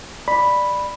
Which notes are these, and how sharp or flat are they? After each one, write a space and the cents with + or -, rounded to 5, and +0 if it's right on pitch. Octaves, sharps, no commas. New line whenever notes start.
D5 +15 B5 +0